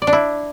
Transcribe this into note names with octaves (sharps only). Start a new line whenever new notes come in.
D5
D4
E4